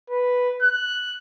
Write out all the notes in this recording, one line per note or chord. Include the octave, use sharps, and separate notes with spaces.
B4
F#6